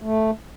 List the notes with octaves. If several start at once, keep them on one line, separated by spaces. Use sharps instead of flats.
A3